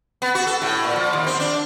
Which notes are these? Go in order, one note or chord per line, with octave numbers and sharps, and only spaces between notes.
B3
F#4
A4
A2
A#2
F3
D#2
C4
D4